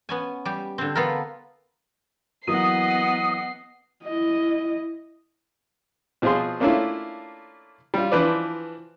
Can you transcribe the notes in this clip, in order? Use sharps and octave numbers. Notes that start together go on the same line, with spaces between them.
B3 C#4 G#5
G3 G4
D3 C4
B3 F4 A4 A#4
E3 F#3 A#3 B3 D#5 F#5 D#6 C7
E4 D#5
B2 F3 C4 F4 G#4 C6
A3 A#3 C#4 D4 E4 F4
G3 F4
E3 F3 D4 B4 C5 D5